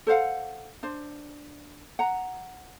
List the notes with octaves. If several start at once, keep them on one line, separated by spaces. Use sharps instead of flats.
A4 C5 F5 F#5
D4 C5
F#5 A#5